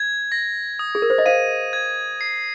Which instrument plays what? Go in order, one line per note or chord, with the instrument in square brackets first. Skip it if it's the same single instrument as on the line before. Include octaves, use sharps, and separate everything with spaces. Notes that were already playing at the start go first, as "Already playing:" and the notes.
Already playing: [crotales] G#6
A#6
D#6
[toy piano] G#4
A#4
C5
D#5
[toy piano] C5 F5 [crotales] D#7
[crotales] G#6
C7